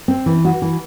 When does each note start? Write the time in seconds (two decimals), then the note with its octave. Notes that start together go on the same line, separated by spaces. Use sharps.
0.08 C4
0.26 E3
0.45 F#4
0.62 E3